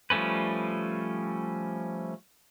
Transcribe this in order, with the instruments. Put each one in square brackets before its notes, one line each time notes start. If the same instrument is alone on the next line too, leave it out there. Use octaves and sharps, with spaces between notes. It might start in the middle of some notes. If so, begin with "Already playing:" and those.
[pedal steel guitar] F3 G3 A3 C#4 B4